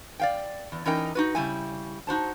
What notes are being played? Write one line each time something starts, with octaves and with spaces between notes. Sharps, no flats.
D5 F5 G5
E2
E3 C#4 D#4 A#4 G5
D#4 F#4 B4
C#3 G3 E4 G#5
D#4 F#4 C5 A5